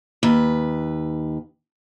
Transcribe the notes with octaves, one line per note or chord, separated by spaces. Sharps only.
D#2 B4